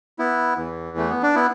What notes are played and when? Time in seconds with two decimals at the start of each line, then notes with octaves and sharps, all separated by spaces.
0.19 B3 E4
0.58 E2 E3
0.97 A3
1.10 B3
1.23 D4
1.35 B3 E4